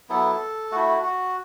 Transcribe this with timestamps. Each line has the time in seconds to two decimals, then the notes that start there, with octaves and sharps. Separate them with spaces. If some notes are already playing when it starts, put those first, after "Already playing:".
0.09 F#3 B3 E4 A4
0.72 A3 E4 F#4
1.03 F#4